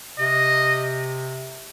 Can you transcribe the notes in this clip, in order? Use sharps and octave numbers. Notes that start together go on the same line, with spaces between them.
C3 D#5